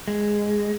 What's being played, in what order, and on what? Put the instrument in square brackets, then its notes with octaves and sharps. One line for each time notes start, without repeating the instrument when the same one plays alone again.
[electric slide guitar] G#3